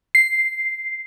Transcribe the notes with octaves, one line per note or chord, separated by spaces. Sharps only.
C7